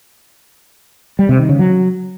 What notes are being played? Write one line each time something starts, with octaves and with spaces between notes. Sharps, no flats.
G3
C3
D#3
C#3
F#3